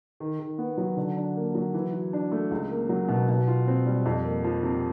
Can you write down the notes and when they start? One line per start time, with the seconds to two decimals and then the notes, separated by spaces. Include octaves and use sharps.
0.20 D#3
0.39 D#3
0.58 B3
0.77 F#3
0.97 D3
1.17 D4
1.36 A#3
1.55 F#3
1.74 E3
1.93 F#4
2.13 D4
2.32 A3
2.51 C#2
2.70 A#3
2.89 F#3
3.08 B2
3.29 B2
3.47 F4
3.67 C4
3.86 G3
4.06 F2
4.24 A#3
4.44 F3
4.63 C3